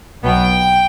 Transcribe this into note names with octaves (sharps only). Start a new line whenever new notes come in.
B1 B2 F#3 B3 G5